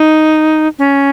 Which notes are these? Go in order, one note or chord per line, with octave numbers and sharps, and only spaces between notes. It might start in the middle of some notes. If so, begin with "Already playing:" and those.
Already playing: D#4
C#4